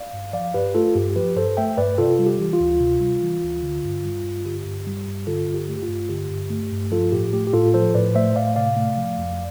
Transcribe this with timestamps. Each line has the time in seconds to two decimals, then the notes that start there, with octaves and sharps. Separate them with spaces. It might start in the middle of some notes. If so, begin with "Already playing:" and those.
Already playing: D5 F5
0.13 G2
0.33 F3 D5 F5
0.54 G2 G4 B4
0.74 A3 F4 A4
0.95 G2 G4
1.16 F3 G4 B4
1.36 G2 A4 C5
1.57 A3 E5 G5
1.77 G2 B4 D5
1.98 C3 F4 A4
2.19 G3
2.26 G4
2.39 E3
2.53 F4
2.60 D2
2.80 C3
3.01 G3
3.22 E3
3.43 D2
3.63 D3
3.84 G2
4.04 G3
4.24 G2
4.45 D3 G4
4.66 G2
4.87 G3
5.07 G2
5.27 D3 F4 A4
5.48 G2
5.54 G4
5.69 A3
5.76 G4
5.83 F4
5.89 G2
6.09 D3 G4
6.30 G2
6.50 A3
6.72 G2
6.91 F3 F4 A4
7.12 A2 G4
7.33 A3 G4
7.47 G4
7.53 A2 F4 A4
7.74 F3 A4 C5
7.94 A2 B4 D5
8.15 A3 C5 E5
8.36 A2 D5 F5
8.56 C3 D5 F5
8.77 A3
8.97 F3
9.18 F2